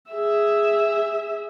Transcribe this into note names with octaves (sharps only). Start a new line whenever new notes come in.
G#4 E5